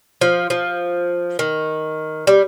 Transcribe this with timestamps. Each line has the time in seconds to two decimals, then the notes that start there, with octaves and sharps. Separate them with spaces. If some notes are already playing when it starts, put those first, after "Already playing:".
0.21 F3
0.50 F3
1.39 D#3
2.27 G3